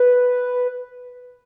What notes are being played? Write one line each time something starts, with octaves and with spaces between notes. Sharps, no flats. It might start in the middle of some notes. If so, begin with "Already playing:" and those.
Already playing: B4